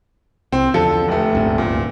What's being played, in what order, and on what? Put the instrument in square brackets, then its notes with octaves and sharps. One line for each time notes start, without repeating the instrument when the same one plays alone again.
[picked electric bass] C2 [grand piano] C4
[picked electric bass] E2 D3 F3 [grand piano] A4
[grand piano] F1 A3
[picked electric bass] D#1 G#1 D2
[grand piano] A#2